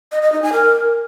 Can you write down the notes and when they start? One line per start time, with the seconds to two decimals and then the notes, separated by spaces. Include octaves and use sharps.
0.12 D#5
0.22 D#5
0.32 D#4
0.42 G#5
0.53 A#4